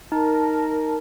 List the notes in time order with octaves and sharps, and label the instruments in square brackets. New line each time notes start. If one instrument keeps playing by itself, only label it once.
[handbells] D#4 [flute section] A#4 A5